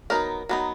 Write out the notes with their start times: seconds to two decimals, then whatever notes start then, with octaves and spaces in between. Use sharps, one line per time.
0.10 F#3 B3 D#4 A#4
0.49 F#3 B3 D#4